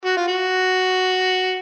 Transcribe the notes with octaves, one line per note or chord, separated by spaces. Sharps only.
F#4
F4
F#4